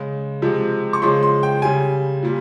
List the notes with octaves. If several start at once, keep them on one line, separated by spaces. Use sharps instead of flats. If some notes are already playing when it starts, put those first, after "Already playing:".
Already playing: C#3 G#3
C3 F3 G#3
C#6
C#3 F3 G#3 C6
C6
G5
C#3 G3 G#5
A#2 G3